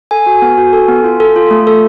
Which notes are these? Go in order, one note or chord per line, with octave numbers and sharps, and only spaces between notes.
A4 G#5
F#4
B3
F#4
A4
B3
F4
A4
F4
A3
A4